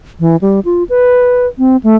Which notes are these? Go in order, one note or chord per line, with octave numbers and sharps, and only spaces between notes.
E3
G3
F4
B4
C4
A3